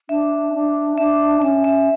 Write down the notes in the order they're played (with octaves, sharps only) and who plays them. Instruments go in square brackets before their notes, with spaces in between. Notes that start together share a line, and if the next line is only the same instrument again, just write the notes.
[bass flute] D4 [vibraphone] E5
[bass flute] D4
[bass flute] D4 [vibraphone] E5
[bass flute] C#4 [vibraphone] E5
[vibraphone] E5